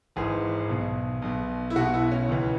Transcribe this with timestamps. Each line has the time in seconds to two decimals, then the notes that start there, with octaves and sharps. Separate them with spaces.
0.16 G#1 G#2 E3 G#4
0.69 B1 B2
1.22 B1 B2
1.70 E4
1.76 B1 B2 F#4
1.94 E4
2.11 C#4
2.29 C#2 C#3 E3